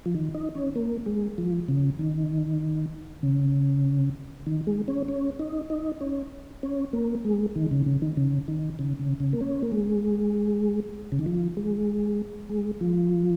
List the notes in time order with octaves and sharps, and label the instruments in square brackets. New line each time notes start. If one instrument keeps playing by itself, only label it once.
[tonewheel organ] F3
D#3
D#4
C#4
A#3
G#3
F3
C#3
D#3
C#3
D#3
G#3
C#4
C#4
D#4
D#4
C#4
C#4
A#3
G#3
D#3
C#3
C#3
D#3
C#3
D#3
C#3
C#3
C#3
A#3
C#4
A#3
G#3
C#3
D#3
F3
G#3
G#3
F3